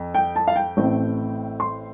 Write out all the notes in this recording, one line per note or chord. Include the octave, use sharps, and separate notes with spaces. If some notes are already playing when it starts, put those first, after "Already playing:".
Already playing: F2
G5
A5
F5
G5
A1 A2 A3 C4
C6